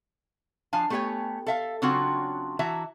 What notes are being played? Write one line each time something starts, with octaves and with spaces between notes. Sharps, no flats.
F3 D4 F5 G#5 A5
A3 B3 G4 C5 C#5 G#5
A4 E5 F5
C#3 F#3 C4 D4 F4 F#4
E3 F#4 E5 A5 A#5